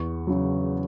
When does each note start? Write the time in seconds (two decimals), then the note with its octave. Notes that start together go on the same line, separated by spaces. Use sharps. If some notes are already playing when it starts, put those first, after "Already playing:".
Already playing: E2 C#6
0.27 C#3 F#3